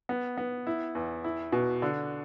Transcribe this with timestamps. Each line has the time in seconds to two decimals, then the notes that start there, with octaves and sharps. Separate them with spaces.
0.09 B3
0.38 B3
0.67 E4
0.95 E2
1.24 E4
1.52 B2
1.82 D3